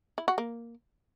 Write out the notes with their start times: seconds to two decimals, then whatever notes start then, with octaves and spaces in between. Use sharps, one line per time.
0.18 E4
0.28 F#4
0.38 A#3